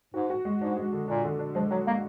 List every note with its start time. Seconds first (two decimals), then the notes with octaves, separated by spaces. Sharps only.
0.14 G#2 F#4
0.30 F#4
0.45 G#3
0.61 G#2 D4
0.77 G#3
0.93 D3
1.08 A#2 D4
1.24 D3
1.39 D4
1.55 F3 G#3
1.71 F#3 F#4
1.86 G#3 A#3